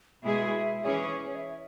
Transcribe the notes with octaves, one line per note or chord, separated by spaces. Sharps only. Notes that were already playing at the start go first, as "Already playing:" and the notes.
B2 G#3 E4 G#4 E5
E3 C#4 G#4 C#5
B4
C#5
C#5
E5